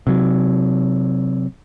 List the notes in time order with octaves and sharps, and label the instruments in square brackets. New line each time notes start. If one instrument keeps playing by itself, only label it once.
[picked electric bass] C3 F#3